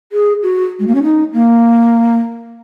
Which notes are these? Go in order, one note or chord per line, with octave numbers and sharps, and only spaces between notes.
G#4
F#4
G#3
A#3
C#4
D#4
A#3